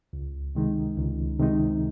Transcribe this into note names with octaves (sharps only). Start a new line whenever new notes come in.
C#2
C3 D#3 G#3 D#4
C#2
C3 D#3 G#3 D#4